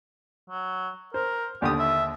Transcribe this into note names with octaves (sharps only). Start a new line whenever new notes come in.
F#3
A#4 C5
D#2 D3 G4 D#6
E5